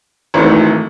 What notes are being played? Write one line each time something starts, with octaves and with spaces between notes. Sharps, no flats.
G#1 G#2 E3 A3